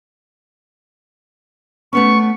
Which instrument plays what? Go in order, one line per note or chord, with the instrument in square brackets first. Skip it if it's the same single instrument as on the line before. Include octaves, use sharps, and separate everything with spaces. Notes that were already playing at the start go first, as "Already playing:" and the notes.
[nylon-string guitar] A3 B3 C#4 [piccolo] C#6